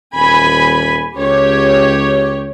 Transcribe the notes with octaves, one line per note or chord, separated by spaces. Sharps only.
D#1 G#5 B5
C#2 G4 C#5